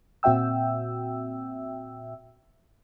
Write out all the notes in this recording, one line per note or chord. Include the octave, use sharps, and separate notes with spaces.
A#2 C4 F#4 E5 G5 E6